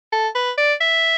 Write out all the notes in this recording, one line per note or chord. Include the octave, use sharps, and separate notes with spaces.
A4
B4
D5
E5